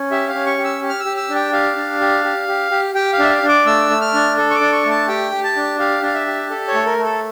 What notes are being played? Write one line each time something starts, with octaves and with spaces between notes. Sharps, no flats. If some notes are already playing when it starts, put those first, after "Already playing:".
Already playing: C#4
G4 E5
F5
C#4
C#6
G4
E6
G4
F6
E6
G4
E6
D4
G5
G4 F5
D4
G4
G4
G4
G4
G4 G5
F5
D4 E5
F5
D4
D6
A3 E6
A3
F6
D4
A4
C#6
D6
D4
C#6
A3
A5
G4 G5
G4
A5
D4
G4 F5
D4 F5
E5
G4
A4
C#5
A3
A#4
A3
A4